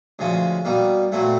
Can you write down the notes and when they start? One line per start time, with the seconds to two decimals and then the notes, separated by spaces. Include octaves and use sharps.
0.19 D2 C#3 F3 G#3 C#4
0.65 B2 G3 A#3 D#4
1.12 A#2 F#3 A3 C4 E4